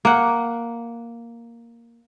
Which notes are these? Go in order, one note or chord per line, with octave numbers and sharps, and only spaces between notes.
A#3 F#5